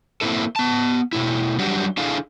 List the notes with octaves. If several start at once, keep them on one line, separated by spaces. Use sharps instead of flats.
A#3 C4 E4 A4
B3 A5
B2 A3 E4
F#3 G3 D4 F#4 G4
D4 E4 G#4 A4 F5